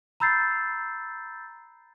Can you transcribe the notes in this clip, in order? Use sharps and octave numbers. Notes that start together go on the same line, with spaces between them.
A#5 B5 E6 G6 A6 C7